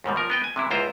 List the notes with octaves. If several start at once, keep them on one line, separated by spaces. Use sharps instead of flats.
D#2 G#2 B2 G3
F3 A#4
B3 D#5 G5
G#5
C3 E3 E4
C#2 G#2 E4 F4 C5 A#5